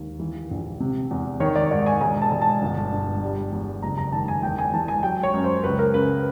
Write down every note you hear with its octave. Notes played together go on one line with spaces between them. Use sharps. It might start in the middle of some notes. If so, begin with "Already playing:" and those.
Already playing: D#2
E3
A#1
C3
E2
D#3 C#5
D5
G#2 D5
G#5
E1 G#5
A5
E1
A5
G1
G2
G3
E2
F#1 A#5
A#5
D#3 A5
G#5
E2 G5
G#5
E3 A5
G#5
F#3 G5
C#5
F#2
C5
C#2 B4
A#4
C#3 B4